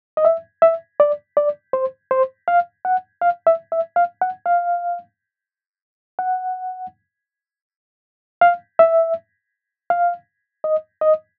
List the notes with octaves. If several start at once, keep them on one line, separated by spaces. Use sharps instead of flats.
D#5
E5
E5
D5
D5
C5
C5
F5
F#5
F5
E5
E5
F5
F#5
F5
F#5
F5
E5
F5
D#5
D#5